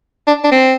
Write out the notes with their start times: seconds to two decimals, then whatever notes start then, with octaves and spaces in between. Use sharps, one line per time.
0.28 D4
0.44 D4
0.52 C4